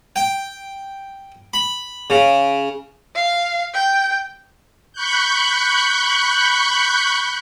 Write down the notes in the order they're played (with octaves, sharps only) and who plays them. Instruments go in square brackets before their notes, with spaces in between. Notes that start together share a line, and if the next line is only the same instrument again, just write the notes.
[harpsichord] G5
B5
C#3
[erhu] F5
G5
[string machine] B5 C#6 F#6 G6